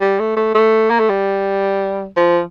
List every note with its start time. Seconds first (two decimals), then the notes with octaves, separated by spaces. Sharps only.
0.01 G3
0.20 A3
0.36 A3
0.54 A3
0.90 A#3
0.99 A3
1.09 G3
2.16 F3